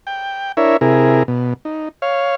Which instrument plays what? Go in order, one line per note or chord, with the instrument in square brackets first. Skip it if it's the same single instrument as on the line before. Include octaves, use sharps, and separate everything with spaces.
[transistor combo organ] G5
D4 E4 A#4 C#5 E5
C3 E4 G#4 A#4
B2
D#4
C#5 F5